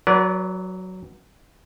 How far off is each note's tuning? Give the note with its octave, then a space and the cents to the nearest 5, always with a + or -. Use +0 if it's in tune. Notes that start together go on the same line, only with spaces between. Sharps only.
F#3 +0 B4 -25 D5 -30